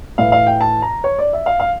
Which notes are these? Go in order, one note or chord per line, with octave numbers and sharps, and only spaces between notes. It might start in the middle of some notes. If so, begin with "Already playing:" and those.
A2 E3 F5
F5
G5
A5
A#5
C#5
D5
E5
F5
F5